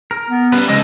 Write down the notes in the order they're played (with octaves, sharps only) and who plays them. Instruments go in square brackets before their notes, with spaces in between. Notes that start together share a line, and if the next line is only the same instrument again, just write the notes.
[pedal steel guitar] A#4
[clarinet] B3
[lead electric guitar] G3 C#4 [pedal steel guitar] B4
[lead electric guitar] F2 C#3 [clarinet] G#3 [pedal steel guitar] G4 A4 D#5